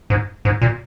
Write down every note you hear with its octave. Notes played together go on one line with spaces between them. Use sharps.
G#2
G#2
A#2